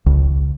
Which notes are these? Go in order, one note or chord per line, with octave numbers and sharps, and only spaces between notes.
C#2